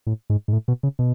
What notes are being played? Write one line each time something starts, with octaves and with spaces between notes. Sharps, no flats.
A2
G#2
G#2
A2
B2
C#3
B2